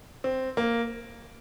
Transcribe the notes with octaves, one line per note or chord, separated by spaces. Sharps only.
C4
A#3